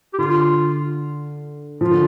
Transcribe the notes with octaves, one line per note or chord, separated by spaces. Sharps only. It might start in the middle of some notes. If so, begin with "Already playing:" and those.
G4
D3 F4
F3 F4
D3